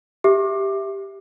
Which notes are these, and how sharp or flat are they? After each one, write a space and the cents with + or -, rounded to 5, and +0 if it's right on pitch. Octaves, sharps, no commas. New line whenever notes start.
G4 +0 E5 +0 D6 +15